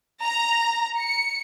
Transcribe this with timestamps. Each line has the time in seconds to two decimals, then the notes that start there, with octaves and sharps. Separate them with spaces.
0.22 A#5
0.98 C#7